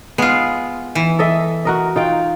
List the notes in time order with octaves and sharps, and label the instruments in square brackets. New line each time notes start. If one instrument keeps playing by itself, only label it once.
[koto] G#3 F4 [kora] B3
[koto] E3
[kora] A4 D#5 E5
F#4 A#4 D#5
D#4 F4 G5